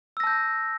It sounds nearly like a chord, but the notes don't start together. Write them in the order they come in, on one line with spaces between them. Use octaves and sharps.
E6 A#6 A5 G6